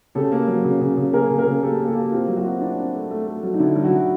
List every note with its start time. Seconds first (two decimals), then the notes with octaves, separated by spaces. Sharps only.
0.15 C#3 G4 A4
0.32 A#3
0.48 F#3
0.64 C#3
0.81 C#3
0.97 C#3
1.13 A#3 G#4 A#4
1.31 C#3
1.38 G#4 A#4
1.47 C#3
1.63 A#3 G4 A4
1.80 A#3
1.87 G4 A4
1.95 A#3
2.12 C4 F4 G4
2.28 F#3
2.37 E4 F#4
2.44 C4
2.61 C4 D4 E4
2.78 C4
2.94 A3
3.11 A3
3.27 A3
3.43 F#3
3.54 D#4
3.59 D3 D4 E4
3.76 F#3
3.84 E4 F#4
3.92 D3